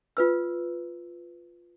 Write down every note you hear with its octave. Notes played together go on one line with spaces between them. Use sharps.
F4 B4 E6